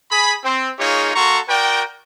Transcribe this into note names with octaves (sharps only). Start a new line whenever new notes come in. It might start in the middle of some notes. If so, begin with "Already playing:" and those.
G#4 B5
C4
A#3 D#4 F4 G#4 C#5
A#3 F#4 A4 A#5 C6 C#6
F#4 A#4 D5 G5